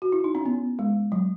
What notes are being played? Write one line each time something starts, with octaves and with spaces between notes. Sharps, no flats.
F#4
E4
D#4
C#4
B3
G#3
F#3